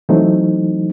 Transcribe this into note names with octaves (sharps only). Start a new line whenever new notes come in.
E3 F#3 A3 C4 D#4